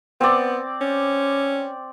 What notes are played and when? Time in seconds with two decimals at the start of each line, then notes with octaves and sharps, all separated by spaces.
0.21 B3 C4 D5
0.81 C#4